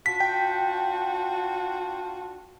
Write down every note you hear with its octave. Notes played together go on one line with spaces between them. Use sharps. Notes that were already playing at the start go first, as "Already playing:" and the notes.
D4 F4 F#4 B6
G5